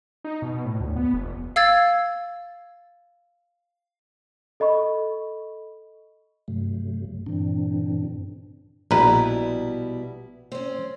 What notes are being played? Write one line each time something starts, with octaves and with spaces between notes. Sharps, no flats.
D#4
B2
A2
D2
B3
F1
F5 E6 G#6 A6
A4 D#5 B5 C#6
G2 C3 F#3 A3
G2 A#2 D3 E3 C4 D4
A#1 B2 G3 E4 B4 A#5
C4 C#4